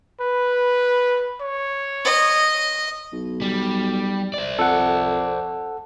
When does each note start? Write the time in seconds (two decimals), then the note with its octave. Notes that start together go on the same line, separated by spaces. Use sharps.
0.20 B4
1.41 C#5
2.05 D#5
3.12 B1
3.41 G3
4.34 C5 D5
4.59 F2 A4 F#5